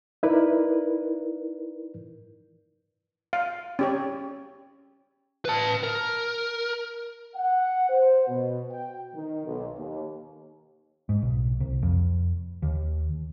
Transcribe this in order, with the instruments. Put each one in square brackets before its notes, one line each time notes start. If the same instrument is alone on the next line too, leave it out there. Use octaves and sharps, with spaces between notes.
[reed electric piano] D#4 E4 A#4 B4 D5
[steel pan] F5
C#4 G4 C#5
[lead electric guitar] B4 A5
A#4
[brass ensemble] F#5
C5
B2
G5
D#3
B1
D#2
[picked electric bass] G#2
B1
C2
F2
D#2